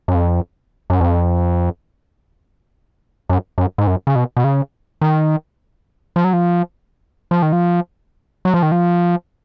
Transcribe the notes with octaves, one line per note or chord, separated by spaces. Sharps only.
F#2
F2
F#2
F2
F#2
F#2
G#2
F#2
C#3
B2
B2
C#3
D#3
F3
F#3
F3
F3
D#3
F3
F#3
F3
D#3
F3